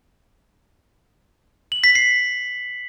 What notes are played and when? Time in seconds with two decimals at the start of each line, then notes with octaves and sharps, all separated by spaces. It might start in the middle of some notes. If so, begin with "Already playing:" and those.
1.72 F#7
1.84 B6
1.95 C7